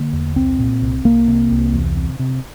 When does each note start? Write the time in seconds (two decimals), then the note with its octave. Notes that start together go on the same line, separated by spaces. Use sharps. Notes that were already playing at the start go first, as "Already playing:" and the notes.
Already playing: D3 A#3
0.13 E2
0.36 C2 C4
0.59 A#2
0.82 C2
1.05 C2 A#3
1.27 C3
1.51 C2
1.73 E2
1.97 C3
2.19 C3